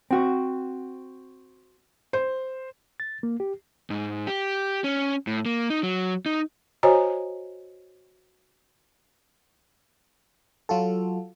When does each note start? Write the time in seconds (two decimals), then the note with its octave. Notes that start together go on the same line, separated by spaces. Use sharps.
0.11 C4 F#4
2.13 C5
3.00 A6
3.23 A#3
3.40 G4
3.90 G#2
4.27 G4
4.84 C#4
5.27 A2
5.46 A#3
5.70 D#4
5.83 F#3
6.26 D#4
6.83 F#4 C5 C#5 D#5 G#5 A#5
10.69 F#3 F4 F#4 A4